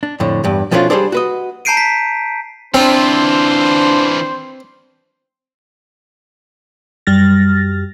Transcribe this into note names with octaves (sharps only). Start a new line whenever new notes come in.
D4
F2 A2 D3
E2 G2
B2 F3 A3 C#4 D4 F4
G3 D4 G#4 A4 C5 D5
F#4 B4 D#5
A5 A#5 G6 C7 D7 D#7
B6
E3 C4 D4 F4 C5
F#2 G3 F6 A6 A#6